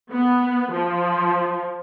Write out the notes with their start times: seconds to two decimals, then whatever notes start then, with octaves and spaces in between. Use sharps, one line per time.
0.11 B3
0.73 F3